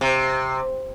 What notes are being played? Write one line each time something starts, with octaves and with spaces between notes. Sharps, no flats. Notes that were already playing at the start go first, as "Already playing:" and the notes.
C3